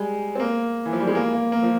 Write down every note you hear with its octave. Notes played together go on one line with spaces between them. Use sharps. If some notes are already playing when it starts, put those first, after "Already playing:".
Already playing: G3 G#3
C4
A#3
E3
F3
G3
G#3
A#3
A#3
A#3
F3